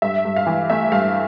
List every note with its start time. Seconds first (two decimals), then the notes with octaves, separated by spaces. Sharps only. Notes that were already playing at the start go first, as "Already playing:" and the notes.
0.02 G2 E5
0.25 G2
0.36 F5
0.47 E3
0.70 A3 E5
0.92 G2 F5